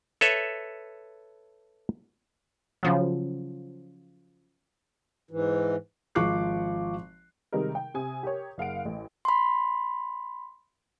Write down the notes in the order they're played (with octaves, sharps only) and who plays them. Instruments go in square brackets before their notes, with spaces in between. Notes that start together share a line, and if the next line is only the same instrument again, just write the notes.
[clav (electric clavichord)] A4 B4 C#5 E5
[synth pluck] C#3 F3 F#3
[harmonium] G#2 E3
[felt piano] G#1 F3 C#6 D6 F#6 C7
[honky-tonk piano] C3 D#3 G3 G#3 D#4 A#4
G5
C3 G#5 D#6
G4 A#4 C#5
F#1 F5 F#5 D7
A1
[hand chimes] B5 C6